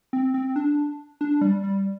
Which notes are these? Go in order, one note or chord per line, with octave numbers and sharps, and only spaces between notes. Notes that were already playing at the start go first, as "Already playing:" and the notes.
C4
C4
D4
D4
G3
G3